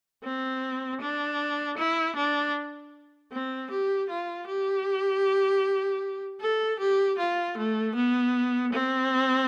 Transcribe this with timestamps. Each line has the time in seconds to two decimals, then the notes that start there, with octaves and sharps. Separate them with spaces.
0.24 C4
1.01 D4
1.78 E4
2.16 D4
3.32 C4
3.71 G4
4.10 F4
4.48 G4
6.41 A4
6.80 G4
7.19 F4
7.58 A3
7.96 B3
8.73 C4